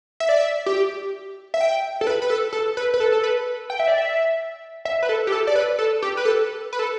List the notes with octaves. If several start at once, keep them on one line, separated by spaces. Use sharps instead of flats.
E5
D5
E5
G4
E5
G5
A4
B4
B4
A4
A4
B4
B4
A4
A4
B4
G5
E5
D5
E5
E5
B4
A4
G4
A4
D5
B4
A4
G4
B4
A4
B4
A4